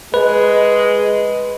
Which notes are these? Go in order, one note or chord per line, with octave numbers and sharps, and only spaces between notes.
G#3 B4